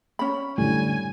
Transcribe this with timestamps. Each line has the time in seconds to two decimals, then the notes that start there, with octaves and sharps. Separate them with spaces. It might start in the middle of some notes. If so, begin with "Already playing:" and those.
0.19 C#4 B5
0.58 F#2 A2 D3 G3 A3 G#5